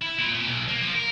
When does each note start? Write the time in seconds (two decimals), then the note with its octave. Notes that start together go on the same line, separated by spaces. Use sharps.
0.02 E4
0.19 A#2
0.35 A#2
0.47 B1
0.68 A#3
0.81 F3
0.95 A#4